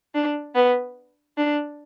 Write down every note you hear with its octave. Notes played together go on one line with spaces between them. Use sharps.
D4
B3
D4